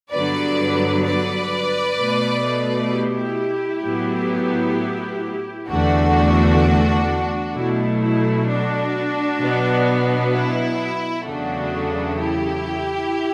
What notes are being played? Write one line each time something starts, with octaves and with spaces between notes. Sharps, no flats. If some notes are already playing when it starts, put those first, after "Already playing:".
G2 D3 F#3 B3 B4 D5
B4 D5
B2 A3
E4 G4
A2 F#3 B3
E2 D3 A3 D4 F#4
B2 F#3 A3 E4
E4
D4 F#4
B2 F#3 B3
E4
E2 C#3 F#3 A3 D4 F#4
E4 G4